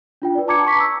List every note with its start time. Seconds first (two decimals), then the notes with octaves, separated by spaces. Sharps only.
0.22 D4 F4 G5
0.35 B4 D5
0.48 A5 A#5 D6 G#6 C#7
0.65 A5 A#5 C#6 D6 B6
0.80 E6